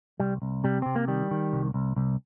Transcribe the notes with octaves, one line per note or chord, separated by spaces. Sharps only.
C2 G3
C2
C3 G3
C3 C4
A#3
D#3 G3
D#3
C2
C2
C2